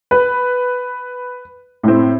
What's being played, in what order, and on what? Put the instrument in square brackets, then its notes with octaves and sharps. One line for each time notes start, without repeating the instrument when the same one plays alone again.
[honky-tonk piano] B4
A2 C4